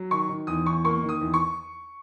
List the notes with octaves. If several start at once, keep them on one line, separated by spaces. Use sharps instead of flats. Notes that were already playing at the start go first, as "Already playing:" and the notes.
Already playing: F#3
D#3 C#6
D#3
E2 D#6
E2 C#6
A#3 C#6
D#3
D#6
E2
C#6